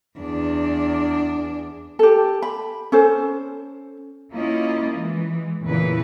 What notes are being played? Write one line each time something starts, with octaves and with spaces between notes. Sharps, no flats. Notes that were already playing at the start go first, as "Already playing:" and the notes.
E2 D4
G4 A4
B5
C#4 A4 C5
A#3 C#4 E4 F4 D#5
E3 G#3
E2 A#2 C#3 E3 B4